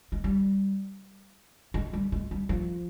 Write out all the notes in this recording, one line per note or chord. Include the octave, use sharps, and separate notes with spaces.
G#3
G3
G#3
G3
G#3
G3
F3